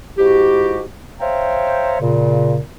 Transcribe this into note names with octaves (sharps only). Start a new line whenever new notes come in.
G#2 E4 F#4 G4
C5 C#5 E5 F5 G5 A#5
A#2 C#3